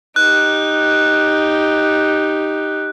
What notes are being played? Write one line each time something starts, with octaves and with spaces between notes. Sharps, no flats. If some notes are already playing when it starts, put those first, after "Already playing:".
D#4 G4 F#6